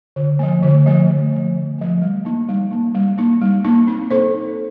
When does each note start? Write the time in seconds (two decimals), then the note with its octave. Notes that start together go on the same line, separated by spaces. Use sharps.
0.16 D3
0.39 F3 A3
0.63 D3
0.86 F3 A3
1.08 D3
1.32 F3 A3
1.55 D3
1.79 F3 A3
2.02 G3
2.25 A#3 D#4
2.49 G3
2.71 A#3 D#4
2.94 G3
3.18 A#3 D#4
3.41 G3
3.64 A#3 D#4
3.87 C4
4.11 D#4 A4 C5